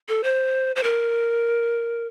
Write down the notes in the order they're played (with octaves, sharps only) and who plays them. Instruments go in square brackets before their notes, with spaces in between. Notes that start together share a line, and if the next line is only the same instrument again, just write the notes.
[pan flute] A4
C5
C5
A#4